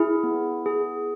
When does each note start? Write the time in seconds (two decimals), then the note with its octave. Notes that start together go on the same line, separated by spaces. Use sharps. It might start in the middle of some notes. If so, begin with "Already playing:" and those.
Already playing: E4 G#4
0.23 B3
0.66 G#4